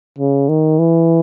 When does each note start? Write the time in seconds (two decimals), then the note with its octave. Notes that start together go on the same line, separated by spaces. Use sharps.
0.19 C#3
0.49 D#3
0.79 E3